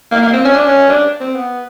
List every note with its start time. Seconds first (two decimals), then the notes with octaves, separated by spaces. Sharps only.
0.12 A#3
0.23 A#3
0.33 C4
0.45 C#4
0.55 D4
0.65 C#4
0.90 D4
1.20 C4
1.35 B3